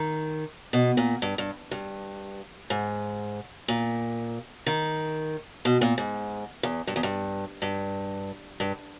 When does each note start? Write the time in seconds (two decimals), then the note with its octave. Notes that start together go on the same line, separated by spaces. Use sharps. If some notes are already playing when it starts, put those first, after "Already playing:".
Already playing: D#3
0.73 B2
0.97 A#2
1.22 G2
1.38 G2
1.71 G2
2.70 G#2
3.68 A#2
4.66 D#3
5.65 B2
5.81 A#2
5.98 G#2
6.63 E2
6.87 G2
6.96 E2
7.03 G2
7.62 G2
8.60 G2